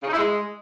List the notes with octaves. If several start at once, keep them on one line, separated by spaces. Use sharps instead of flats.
C#3
D#4
E4
G#3